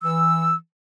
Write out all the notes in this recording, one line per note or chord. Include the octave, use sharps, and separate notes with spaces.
E3 E6